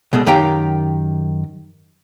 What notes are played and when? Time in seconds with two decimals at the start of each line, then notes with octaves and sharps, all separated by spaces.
0.13 C2 B2 G#3 A3
0.26 F#2 D#3 G4 F5 G5 A#5